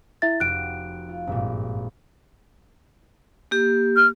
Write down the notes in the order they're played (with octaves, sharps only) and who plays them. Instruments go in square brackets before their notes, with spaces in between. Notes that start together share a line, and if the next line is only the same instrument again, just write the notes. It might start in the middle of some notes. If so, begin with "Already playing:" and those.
[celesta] E4 E5 A6
[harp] F1 F#4 G5 [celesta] F#6 D7
[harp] F4
G#1 G2 A#2
[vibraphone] A#3 G4
[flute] F6